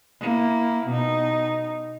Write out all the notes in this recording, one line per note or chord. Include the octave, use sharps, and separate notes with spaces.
A#3 E4
B2 D#4